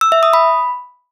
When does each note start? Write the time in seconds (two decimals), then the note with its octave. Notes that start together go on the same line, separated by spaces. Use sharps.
0.01 E6
0.12 E5
0.23 D#6
0.33 B5